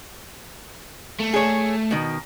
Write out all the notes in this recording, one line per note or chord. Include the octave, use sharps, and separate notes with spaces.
A3
G#4 C#5
B2 D#3